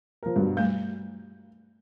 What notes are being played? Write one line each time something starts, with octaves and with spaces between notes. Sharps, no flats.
F3 A#4
G2 B2 F#3
G3 A3 G6